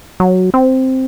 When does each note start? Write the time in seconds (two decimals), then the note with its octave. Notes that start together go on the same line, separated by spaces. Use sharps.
0.20 F#3
0.54 C4